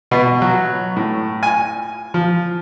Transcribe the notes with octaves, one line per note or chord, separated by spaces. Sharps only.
B2
F#3
A2
G#5
F3